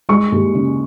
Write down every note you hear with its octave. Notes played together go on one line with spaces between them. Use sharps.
G#3 C#6
D#2
C#3